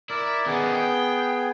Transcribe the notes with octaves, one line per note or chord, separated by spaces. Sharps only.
E4 A#4 D5
D#3 B3 C#4 G#4
G5